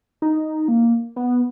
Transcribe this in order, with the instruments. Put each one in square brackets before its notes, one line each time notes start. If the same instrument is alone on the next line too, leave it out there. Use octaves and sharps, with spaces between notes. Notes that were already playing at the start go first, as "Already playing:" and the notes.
[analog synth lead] D#4
A#3
B3